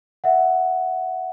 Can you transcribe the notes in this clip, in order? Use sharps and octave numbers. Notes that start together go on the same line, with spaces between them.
E5 F#5